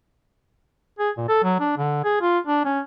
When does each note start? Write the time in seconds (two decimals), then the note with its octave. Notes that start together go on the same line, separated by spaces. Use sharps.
0.99 G#4
1.17 A#2
1.29 A4
1.44 F#3
1.60 D4
1.78 D3
2.04 G#4
2.22 F4
2.47 D4
2.65 C#4